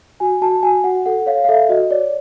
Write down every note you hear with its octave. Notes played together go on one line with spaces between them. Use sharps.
F#4 G#5
F#4 A5
F#4 G#5
F#4 F#5
A4 F#5
C#5 F5
F5
A4 E5
F#4 D#5
C#5 D5